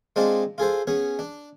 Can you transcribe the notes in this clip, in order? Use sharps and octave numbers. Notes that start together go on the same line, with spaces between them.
G#3 C4 D4 D#4 F4 D5
F4 G#4 A4 C5
B3 C#4 G#4
D4